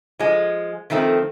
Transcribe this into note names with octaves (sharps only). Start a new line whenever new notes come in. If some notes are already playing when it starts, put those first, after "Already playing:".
F3 G#3
D#3 F3 A3 C4